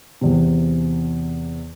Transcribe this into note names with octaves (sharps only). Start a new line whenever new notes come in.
E2 C3